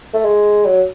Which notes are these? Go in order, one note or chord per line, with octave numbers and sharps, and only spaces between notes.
A3
G#3
F#3